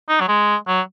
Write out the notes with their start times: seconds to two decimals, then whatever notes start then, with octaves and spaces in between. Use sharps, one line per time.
0.09 D#4
0.20 F#3
0.28 G#3
0.67 F#3